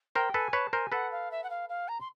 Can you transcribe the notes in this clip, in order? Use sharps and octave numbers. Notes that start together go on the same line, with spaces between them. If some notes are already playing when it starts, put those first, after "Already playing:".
A#4 C5 G5
A4 B4 G#5
B4 C#5 A5
A#4 C5 G#5
A4 B4 F#5
F5
E5
F#5
F5
F5
A#5
C6